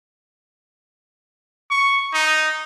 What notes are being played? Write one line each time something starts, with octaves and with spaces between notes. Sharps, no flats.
C#6
D#4